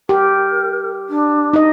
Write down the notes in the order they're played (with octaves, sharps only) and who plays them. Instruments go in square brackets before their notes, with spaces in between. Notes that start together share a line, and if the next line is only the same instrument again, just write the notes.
[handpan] G4 [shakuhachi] A#4
[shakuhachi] D4
[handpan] D#4 D#5